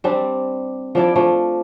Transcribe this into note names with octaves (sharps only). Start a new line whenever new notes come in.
G3 C4 D4
F3 D4 E4 D5
F3 A3 D4